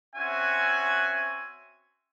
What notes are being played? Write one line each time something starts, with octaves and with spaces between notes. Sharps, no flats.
C4 C#4 F#4 E5 F#5 G#5